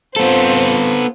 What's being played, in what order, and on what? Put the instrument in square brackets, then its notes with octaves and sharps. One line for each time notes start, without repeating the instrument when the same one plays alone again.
[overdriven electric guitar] B3 A4 [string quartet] C4 F4 C5